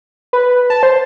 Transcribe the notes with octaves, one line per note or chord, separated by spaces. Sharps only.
B4
A5
C5